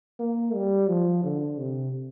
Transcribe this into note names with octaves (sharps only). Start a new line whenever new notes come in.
A#3
G3
F3
D3
C3